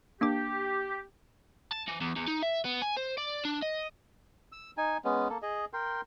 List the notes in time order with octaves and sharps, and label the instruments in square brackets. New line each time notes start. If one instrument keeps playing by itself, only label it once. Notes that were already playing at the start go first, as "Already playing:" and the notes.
[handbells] A#3 D4 D6 [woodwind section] G4
[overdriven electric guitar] A5
E3
E2
E2
D#4
E5
B3
G#5
C5
D5
D4
D#5
[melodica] E6
D#4 G#5
G#3 B3 C#4
A#3 A4
G#4 D#5
A#4 G5 C6